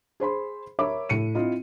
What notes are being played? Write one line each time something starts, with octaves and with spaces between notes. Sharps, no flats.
G#4 C5 B5 C6
A#4 C#5 E5 B5 D6
A2 C#7 D#7
C4 E4 F4 D#5